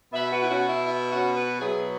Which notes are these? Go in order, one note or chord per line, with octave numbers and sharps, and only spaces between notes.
B2 B3 B4 E5
F#4 B4
E4
C#4 F#4
E4
E4
C#4 F#4
F#4 B4
B2 F#3 B3 E4 G#4